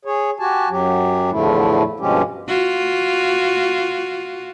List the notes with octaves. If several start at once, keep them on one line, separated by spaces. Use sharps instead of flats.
G#4 C#5
F#4 G4 G#5 A5
F#2 F#3 G4
E2 A2 D3 F3 A3 E4
G2 B2 F3 G#3 C#4 G4
F4 F#4